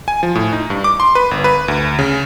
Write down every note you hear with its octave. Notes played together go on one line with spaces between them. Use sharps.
G#5
F3
A2
D#4
G2
D6
C6
B4
G1
B4
D2
C#3